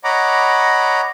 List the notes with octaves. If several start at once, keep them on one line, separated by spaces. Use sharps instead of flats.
C#5 D#5 F#5 A#5 B5 D6